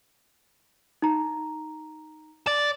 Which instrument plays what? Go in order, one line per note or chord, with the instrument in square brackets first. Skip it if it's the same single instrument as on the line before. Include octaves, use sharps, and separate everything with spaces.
[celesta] D#4 A#5
[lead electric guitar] D5